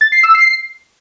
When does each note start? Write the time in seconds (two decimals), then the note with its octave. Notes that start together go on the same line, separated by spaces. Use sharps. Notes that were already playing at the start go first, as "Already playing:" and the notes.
0.01 A6
0.12 C7
0.23 E6
0.35 C7